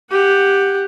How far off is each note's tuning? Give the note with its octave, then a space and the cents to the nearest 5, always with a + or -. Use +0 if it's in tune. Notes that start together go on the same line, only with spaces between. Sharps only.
G4 +10 F#5 +0